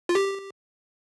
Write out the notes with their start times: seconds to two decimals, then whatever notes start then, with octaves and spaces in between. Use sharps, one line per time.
0.09 F4
0.15 G4